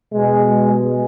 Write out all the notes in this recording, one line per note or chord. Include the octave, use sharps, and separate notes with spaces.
B2 G#3
G#3